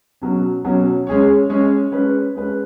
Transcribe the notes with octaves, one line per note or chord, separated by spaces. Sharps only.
B2 F#3 C#4
B2 F#3 C#4
G#3 C#4 G#4 C#5
G#3 C#4 G#4 C#5
G#3 C#4 B4
G#3 C#4 B4